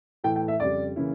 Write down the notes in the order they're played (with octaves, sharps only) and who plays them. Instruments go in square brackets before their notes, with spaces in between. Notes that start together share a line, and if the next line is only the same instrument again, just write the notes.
[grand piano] A2 E3 A3 E4 [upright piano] G5
[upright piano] G5
E5
[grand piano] F2 C#3 G3 [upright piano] D5
[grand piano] C#3 E3 A#3 C#4 E4